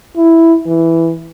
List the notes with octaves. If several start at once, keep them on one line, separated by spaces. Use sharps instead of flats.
E4
E3